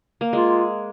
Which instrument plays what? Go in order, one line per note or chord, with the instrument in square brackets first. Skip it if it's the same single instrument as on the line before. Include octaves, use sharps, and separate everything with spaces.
[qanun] A#3
[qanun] G#3 [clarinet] F4